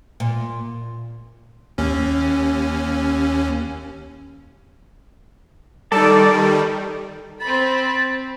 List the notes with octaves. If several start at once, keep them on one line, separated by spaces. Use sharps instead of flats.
A#2
D#2 C#4
D#3 G3 D#4 A4 D5 A5
C4 B5 A6